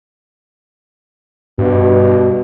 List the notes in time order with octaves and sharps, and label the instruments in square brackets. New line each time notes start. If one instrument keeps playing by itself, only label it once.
[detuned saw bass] G2 [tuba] B2